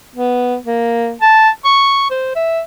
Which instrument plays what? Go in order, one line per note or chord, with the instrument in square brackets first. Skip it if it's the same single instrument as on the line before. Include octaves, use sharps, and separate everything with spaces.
[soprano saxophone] B3
A#3
A5
C#6
C5
E5